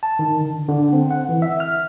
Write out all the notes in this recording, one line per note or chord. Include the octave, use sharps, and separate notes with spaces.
A5
D#3
D3
D3
C4
F#5
E3
E5
F6